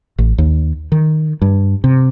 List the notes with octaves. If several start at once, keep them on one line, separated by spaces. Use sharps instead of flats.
A1
D#2
D#3
G2
C3